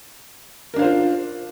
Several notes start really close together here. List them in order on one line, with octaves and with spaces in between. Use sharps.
A#4 D4 F5 C5 F4